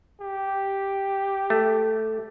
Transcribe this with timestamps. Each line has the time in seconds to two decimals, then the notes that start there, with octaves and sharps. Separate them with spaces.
0.21 G4
1.50 A3